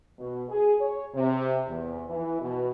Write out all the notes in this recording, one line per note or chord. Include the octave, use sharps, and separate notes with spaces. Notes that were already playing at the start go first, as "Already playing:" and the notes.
B2
G#4
C#5
C3
E2
E3
B2